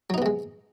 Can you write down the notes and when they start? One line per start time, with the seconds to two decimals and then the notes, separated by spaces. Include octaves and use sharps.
0.10 F#3
0.14 D#4
0.18 B3
0.22 C3
0.26 G#3